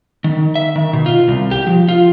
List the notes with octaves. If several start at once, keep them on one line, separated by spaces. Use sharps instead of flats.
D#3
E5
D#3
B2
F4
C2
G4
F3
F4